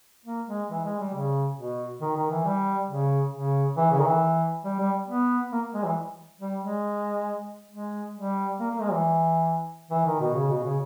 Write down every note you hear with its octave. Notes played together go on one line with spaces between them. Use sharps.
A#3
G#3
E3
G#3
G3
C#3
B2
D#3
D#3
E3
G3
C#3
C#3
E3
C#3
D#3
E3
G3
G3
B3
A#3
G#3
E3
G3
G#3
G#3
G3
A#3
A#3
G#3
E3
E3
D#3
B2
C#3
B2
C#3